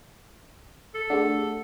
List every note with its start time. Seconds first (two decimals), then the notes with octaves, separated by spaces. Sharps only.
0.94 A4
1.10 A3 D4 G4 G#4 F#5